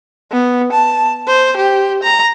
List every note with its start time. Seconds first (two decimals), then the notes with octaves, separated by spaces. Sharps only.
0.31 B3
0.72 A5
1.28 C5
1.57 G4
2.03 A#5